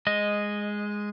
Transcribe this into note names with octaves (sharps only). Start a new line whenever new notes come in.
G#3 D#5